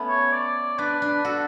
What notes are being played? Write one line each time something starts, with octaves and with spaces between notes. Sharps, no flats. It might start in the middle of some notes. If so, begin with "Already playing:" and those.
Already playing: A3 B3 C#4
C#5
D5
D4 B4
D4
F#4 A4